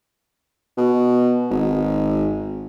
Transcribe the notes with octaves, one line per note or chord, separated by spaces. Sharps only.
B2
G#1